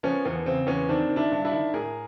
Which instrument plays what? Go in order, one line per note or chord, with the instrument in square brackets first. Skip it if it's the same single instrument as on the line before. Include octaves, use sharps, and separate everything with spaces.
[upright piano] F3 B3 C#4
E2 B3
C#3 C4
E2 B3 C#4
D#3 C4 D4
D#3
D4 E4
G2
D4 E4
D#3
A2 G#4 A#4